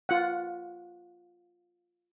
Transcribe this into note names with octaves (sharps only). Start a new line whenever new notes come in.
F4 F#5